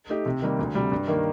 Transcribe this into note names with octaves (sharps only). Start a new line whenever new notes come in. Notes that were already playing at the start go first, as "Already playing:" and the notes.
A3 D#4 G4
C3
D#3 G3 A#3
D2
C3 G3
G2
D#3 A#3